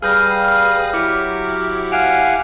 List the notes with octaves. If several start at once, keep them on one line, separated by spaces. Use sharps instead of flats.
G3 G#4 B4 F5 D#6 F6 G6 A#6
F#3 E4 G4 D6 C#7
F5 F#5 G#5 D7 E7 F7